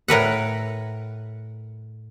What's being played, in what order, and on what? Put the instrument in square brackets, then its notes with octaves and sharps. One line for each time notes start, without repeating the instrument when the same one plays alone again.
[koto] A2 A#4 B4 F#5